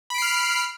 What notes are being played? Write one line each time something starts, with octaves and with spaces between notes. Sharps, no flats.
B5 F6 C7 D7